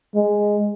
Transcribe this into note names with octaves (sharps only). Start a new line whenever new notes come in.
G#3